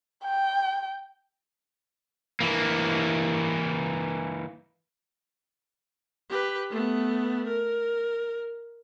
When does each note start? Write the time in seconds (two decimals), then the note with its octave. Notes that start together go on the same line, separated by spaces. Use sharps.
0.24 G5
2.41 E3 A#3
6.29 G4 B4
6.70 A3 B3
7.47 A#4